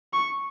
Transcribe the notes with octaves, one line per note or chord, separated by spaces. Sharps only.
C#6